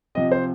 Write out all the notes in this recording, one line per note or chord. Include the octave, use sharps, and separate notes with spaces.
C3 F3 C4 D#5
C5